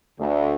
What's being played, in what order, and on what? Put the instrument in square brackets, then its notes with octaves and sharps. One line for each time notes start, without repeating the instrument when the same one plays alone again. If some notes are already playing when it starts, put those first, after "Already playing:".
[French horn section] D2